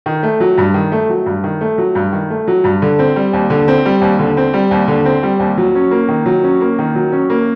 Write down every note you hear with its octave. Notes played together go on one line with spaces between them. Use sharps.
D#3
A3
F#3
G2
D#3
A3
F#3
G2
D#3
A3
F#3
G2
D#3
A3
F#3
G2
D3
C4
G3
D#2
D3
C4
G3
D#2
D3
C4
G3
D#2
D3
C4
G3
D#2
F#3
C#4
A#3
D#3
F#3
C#4
A#3
D#3
F#3
C#4
A#3